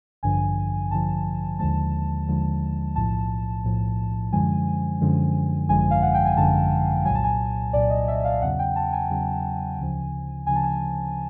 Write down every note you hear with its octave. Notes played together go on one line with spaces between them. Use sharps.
A1 G2 D3 F3 G#5
A1 G2 D3 F3 A5
D#2 D3 F3 G#3 A5
D#2 D3 F3 G#3
B1 A2 F3 A5
B1 A2 F3
F#2 D3 F3 G#3 G#5
F#2 D3 F3 G#3
G#1 F#2 D3 F3 G#3 G#5
F5
F#5
G5
G#5
G#1 F#2 D3 F3 G#3 A5
C2 A#2 F#3 G#5
A5
G#5
C2 A#2 F#3 D5
D#5
E5
F5
E2 C#3 F#3 F#5
G5
A5
G#5
E2 C#3 F#3
D2 C#3 F3
D2 C#3 F3 G#5
A5
G#5